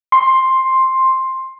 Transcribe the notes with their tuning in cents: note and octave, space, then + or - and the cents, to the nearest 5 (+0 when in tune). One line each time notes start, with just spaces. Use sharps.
C6 +10